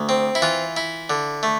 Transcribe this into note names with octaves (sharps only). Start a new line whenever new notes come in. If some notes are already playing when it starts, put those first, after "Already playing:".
Already playing: D2
C4
E4
E3 F4
E4
D3
A3